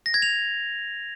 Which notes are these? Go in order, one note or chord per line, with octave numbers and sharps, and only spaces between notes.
A#6
G#6
F7